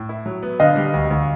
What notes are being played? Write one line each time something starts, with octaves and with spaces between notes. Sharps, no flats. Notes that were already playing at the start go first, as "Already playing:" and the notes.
Already playing: A2
E4
F#3
B3
D3 D#5 F5
G3
D2
D2